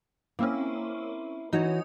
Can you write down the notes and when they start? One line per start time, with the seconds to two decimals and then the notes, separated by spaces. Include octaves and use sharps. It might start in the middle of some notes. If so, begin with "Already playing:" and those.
0.39 A#3 C4 C#4 E4
1.53 E3 D#4 F#4 C#5 D#5